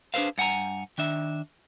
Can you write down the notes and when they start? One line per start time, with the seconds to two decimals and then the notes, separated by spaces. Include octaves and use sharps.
0.14 D4 G#4 A4 B4 C5 F5
0.38 G2 F#5 G#5 A#5
0.98 D#3 D4 E5